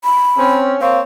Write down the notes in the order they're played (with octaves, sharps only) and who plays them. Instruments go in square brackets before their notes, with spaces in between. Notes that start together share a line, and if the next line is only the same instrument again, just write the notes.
[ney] B5
[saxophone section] C4 C#4
[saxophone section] A#3 C4 C#5 [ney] F5